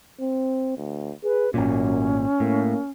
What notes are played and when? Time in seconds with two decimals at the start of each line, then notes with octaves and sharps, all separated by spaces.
0.21 C4
0.78 D2
1.24 G#4 B4
1.54 G#1 F#2 A#2 C#4
2.40 A2 A#3